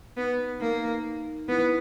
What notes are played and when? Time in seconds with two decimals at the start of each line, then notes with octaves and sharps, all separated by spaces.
0.17 B3 D#4
0.60 A#3 D#4
1.48 B3 E4